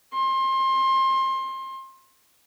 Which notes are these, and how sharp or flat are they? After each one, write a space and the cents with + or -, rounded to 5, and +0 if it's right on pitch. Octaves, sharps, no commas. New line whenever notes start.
C6 +25